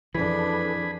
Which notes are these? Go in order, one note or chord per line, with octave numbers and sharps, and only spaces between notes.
F2 E3 D4 G#4 A4 B4 B5